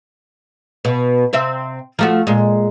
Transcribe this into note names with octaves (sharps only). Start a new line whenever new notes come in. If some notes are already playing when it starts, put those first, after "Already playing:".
B2
C3 C4 E5
F3 A3 F#4
A#2 G#3